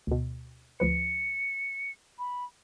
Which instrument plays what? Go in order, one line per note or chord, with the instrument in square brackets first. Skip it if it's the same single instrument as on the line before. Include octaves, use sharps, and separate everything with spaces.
[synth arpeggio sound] D2 B2
[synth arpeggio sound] D2 F3 B4 [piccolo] C#7
[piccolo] B5